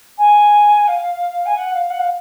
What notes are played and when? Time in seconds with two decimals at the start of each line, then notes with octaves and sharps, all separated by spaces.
0.18 G#5
0.88 F5
1.46 G#5
1.56 F#5
1.74 F5
1.90 F#5
2.00 F5